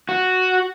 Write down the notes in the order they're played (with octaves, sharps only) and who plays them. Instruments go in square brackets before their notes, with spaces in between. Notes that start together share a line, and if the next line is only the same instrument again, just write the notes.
[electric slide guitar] F#4